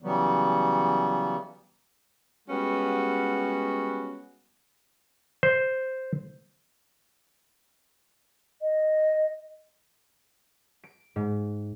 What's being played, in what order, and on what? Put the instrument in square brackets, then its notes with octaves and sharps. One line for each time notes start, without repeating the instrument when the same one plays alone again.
[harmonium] C#3 E3 F#3 G3 B3
[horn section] G3 G#3 B3 C#4 F#4
[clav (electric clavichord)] C5
[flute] D#5
[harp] D7
G#2